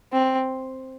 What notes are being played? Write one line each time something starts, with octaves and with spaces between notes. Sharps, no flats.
C4